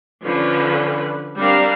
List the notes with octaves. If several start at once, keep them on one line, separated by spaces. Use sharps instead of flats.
D3 F3 C#4 B4
G3 C4 D4 A#4 F5